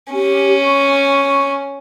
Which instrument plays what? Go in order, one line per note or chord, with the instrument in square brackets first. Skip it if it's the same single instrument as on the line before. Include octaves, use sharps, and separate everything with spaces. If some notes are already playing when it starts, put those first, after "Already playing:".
[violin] C#4 [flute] G4
[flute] C#6